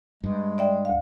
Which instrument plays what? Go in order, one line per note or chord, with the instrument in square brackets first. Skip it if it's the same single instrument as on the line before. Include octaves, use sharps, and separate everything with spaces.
[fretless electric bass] G2 [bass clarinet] G#3
[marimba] D5 E5 G5
D2 F5